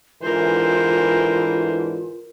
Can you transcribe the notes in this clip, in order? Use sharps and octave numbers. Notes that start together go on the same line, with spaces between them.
G#2 D3 E3 F4 A#4 C5